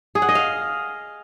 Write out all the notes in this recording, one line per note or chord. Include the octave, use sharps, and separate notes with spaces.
G#4
F#5
D#5
F5